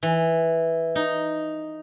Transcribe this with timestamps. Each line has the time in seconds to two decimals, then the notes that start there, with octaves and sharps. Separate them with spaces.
0.03 E3
0.95 D#4